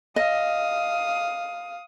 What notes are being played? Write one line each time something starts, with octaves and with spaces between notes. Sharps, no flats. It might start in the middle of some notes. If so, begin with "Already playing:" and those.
D#5 F5 D#6